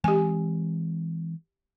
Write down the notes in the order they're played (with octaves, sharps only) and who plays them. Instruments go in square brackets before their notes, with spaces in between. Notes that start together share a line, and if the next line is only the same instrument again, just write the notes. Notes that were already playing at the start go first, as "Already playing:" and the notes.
[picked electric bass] E3 G#3 C4 [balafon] G4 G#5